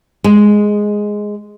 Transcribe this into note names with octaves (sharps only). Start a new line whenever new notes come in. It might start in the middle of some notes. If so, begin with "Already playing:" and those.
G#3